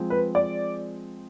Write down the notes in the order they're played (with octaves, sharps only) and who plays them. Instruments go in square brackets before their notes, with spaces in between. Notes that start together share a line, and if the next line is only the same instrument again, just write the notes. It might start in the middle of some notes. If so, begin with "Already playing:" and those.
Already playing: [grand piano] F3 G#3 C4 G#4
[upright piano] B4
D5